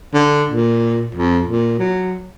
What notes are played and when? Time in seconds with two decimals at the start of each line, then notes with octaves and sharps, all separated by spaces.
0.14 D3
0.51 A#2
1.15 F2
1.48 A#2
1.79 F#3